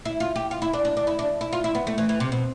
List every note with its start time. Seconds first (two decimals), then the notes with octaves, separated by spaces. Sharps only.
0.05 E4
0.20 F4
0.36 G4
0.51 F4
0.62 E4
0.73 D4
0.85 D4
0.97 D4
1.07 E4
1.19 D4
1.41 E4
1.53 F4
1.64 E4
1.75 B3
1.87 A3
1.98 E3
2.09 E3
2.20 C3
2.32 B2